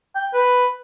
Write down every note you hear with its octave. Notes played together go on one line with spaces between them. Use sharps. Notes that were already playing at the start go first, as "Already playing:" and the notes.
G5
B4